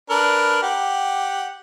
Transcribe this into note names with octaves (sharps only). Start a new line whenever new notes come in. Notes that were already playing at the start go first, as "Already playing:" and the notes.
D4 A#4 B4
G4 F#5